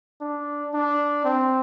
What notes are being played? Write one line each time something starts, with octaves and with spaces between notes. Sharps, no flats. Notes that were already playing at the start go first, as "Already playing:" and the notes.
D4
D4
C4